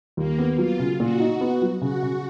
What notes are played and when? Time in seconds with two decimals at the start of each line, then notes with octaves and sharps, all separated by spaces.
0.17 D#2 A#3
0.38 B3
0.58 F#3 F4
0.79 C#3
1.00 A#2 F#4
1.20 D#4
1.41 B3
1.62 F#3
1.81 C#3 F#4
2.03 C#3